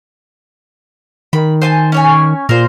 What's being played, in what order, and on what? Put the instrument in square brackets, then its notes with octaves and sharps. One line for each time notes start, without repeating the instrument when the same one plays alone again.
[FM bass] D#3 [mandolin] B5
[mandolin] C5 G#5 A5
C#4 C#5 G#5
[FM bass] A#2 [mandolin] A#4 C5